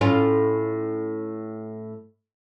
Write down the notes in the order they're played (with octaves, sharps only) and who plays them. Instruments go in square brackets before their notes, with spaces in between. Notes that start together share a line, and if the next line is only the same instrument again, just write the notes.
[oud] A2 C#4 F4